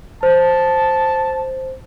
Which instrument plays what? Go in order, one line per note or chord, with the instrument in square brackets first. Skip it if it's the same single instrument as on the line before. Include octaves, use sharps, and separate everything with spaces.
[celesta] C5 [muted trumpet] A5